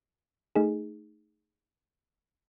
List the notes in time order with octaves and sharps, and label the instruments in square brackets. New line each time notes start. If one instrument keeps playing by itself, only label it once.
[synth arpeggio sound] A3 D#4 G#4